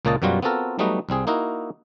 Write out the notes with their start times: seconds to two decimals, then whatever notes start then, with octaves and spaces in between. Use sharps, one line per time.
0.05 C#2 A#2 A#3 C#5 D#5 A5
0.22 F#2 B2 F#3 G3 F4 F#4
0.42 B3 C4 F4 F#4 A4 A#4
0.79 F#3 G3 A3 B3 D#4 F#4
1.09 C2 G3 C4 G#4
1.27 A#3 D#4 E4 F#4 A#4